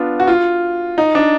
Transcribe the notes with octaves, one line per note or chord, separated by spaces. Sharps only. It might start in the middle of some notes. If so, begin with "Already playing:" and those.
Already playing: B3 D4 F4
F#4
F4
D#4
D4